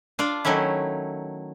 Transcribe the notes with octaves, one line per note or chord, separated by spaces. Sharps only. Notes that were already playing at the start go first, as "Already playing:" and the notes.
D4 F4 D5
D#3 F#3 A3 C#4 E4